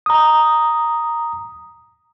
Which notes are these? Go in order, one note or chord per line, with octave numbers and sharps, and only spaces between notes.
A#5 D#6